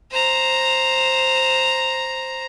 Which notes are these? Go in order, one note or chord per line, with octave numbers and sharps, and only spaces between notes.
C5 A#5